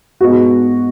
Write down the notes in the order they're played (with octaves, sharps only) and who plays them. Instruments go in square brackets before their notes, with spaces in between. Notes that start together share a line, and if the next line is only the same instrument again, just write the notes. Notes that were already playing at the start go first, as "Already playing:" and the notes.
[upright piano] G#2 G#3 B3 F#4